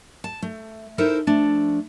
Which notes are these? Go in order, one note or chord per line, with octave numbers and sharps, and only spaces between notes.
A5
A3
D#4 E4 A4 A#4 C5
F3 A3 D4